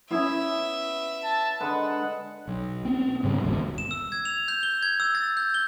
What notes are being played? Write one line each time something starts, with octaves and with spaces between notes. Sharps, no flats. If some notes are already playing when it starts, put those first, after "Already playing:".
B3 C#4 E4 F4 E5
A5
D3 G#3 B4 F#5
B1
B3 C4
G#1 G#2 C#3 G3
G1 D#2 G#2 B2
E7
E6
G#6
F7
G6
G7
G#6
E6
A6
G6
G7